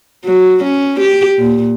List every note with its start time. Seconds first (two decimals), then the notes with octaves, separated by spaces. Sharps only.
0.25 F#3
0.63 C#4
1.00 G4
1.38 A#2